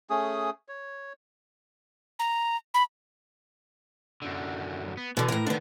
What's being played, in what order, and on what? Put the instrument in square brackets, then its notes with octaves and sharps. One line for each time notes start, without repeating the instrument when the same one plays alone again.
[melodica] A3 C#4 G#4 D#6
C#5
[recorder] A#5
B5
[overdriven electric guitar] F#2 D3
B3
[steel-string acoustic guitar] B2 D3 [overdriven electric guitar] E3
[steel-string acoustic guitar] A2 A#4
[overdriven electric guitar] D3 D#3 [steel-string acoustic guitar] B3 D4